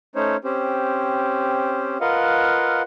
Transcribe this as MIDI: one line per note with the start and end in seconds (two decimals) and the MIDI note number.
0.15 0.36 57
0.15 0.36 61
0.15 0.36 63
0.15 0.36 72
0.15 0.36 73
0.44 1.98 60
0.44 1.98 61
0.44 1.98 67
0.44 1.98 72
2.01 2.82 65
2.01 2.82 70
2.01 2.82 71
2.01 2.82 75
2.01 2.82 77
2.01 2.82 78